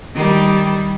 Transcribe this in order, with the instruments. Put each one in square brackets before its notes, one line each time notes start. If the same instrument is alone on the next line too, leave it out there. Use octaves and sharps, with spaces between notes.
[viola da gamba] D#3 G3